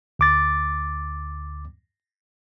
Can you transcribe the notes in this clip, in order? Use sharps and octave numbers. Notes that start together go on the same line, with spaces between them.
D2 D6 A6